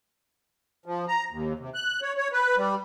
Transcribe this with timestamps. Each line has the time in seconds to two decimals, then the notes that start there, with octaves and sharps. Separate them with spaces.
0.86 F3
1.08 A#5
1.31 D#2
1.59 C3
1.74 F#6
2.02 C#5
2.17 C#5
2.33 B4
2.57 G3